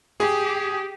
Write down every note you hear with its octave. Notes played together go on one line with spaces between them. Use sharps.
G4 G#4